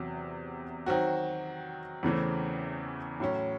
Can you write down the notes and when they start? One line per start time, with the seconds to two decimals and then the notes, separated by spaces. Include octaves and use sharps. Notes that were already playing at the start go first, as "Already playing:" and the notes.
Already playing: E2 C3 F#3
0.86 D#3 F#3 C4 F#4
2.03 E2 C#3 E3 A3 C4
3.20 A2 F#3 C#4